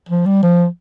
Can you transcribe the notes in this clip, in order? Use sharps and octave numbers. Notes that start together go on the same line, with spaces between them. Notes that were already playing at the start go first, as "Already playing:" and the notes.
F3
G3
F3